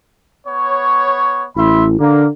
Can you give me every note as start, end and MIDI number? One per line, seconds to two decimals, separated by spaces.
0.45 1.44 59
0.45 1.44 73
1.56 1.95 33
1.56 1.84 76
1.56 1.84 83
1.56 1.84 84
2.00 2.28 50
2.00 2.24 58